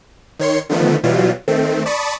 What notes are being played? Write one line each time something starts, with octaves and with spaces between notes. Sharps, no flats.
D#3 C#5 C6 C#7
D3 D#3 F3 A3 B3
B2 E3 F#3 G3 F4
D#3 A3 C4
D5 A5 B5 C#6 D#6